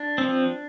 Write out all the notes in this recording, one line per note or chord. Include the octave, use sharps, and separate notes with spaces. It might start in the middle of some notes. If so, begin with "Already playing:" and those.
Already playing: D4
F3 C4